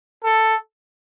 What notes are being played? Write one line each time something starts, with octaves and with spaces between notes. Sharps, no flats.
A4